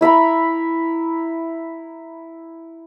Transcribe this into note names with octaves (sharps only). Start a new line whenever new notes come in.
E4 E5 A#5 B5